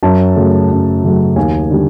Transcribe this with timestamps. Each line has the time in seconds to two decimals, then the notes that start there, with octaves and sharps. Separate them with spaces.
0.03 F#2 A5
0.36 C#3 F#3 A3
0.70 F#2
1.03 C#3 F#3 A3
1.36 D#2 G#5
1.71 D3 G3